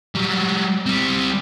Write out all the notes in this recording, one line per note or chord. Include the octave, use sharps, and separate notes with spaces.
F#3 G3
G3 C4